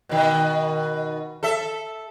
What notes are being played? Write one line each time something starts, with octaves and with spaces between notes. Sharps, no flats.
B2 D#3
A4 E5